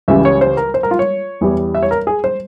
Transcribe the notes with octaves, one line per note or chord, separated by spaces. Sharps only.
C#2 C#3 E3 G3 E5
C#5
C5
A#4
C5
A#4
F4
C#5
E2 E3 G3
E5
C#5
A#4
G#4
C5